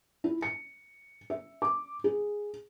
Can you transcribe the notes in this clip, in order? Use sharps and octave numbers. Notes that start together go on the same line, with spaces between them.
E4
C#7
E5
D6
G#4